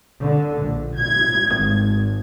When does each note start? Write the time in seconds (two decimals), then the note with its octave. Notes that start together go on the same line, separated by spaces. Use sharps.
0.23 D3
0.62 A#1
0.96 G#6
1.54 G#1